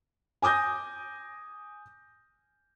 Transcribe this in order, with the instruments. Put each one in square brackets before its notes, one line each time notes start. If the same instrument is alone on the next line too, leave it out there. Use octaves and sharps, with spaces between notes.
[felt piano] G#5 D6 D#6 G6 A#6